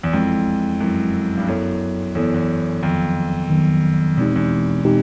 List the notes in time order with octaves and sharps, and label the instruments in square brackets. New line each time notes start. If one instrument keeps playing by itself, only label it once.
[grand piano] E2
[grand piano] F2 [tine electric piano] G#3 C4 E4
[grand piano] F#2 [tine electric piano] G#3 C4 E4
[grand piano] G2
[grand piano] F#2 [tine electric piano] B3 E4 A4 C#5
[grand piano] E2 [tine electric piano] B3 E4 A4 C#5
[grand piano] E2
[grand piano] F2 [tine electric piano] D#3 F#3 B3
[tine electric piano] D#3 F#3 B3
[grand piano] E2 [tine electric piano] B2 G#3 C4 D#4 G4
[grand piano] E2
[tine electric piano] B2 G#3 C4 D#4 G4